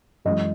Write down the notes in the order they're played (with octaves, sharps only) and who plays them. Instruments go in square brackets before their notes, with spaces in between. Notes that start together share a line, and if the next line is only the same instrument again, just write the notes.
[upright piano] F#2 E3 G#3 D#5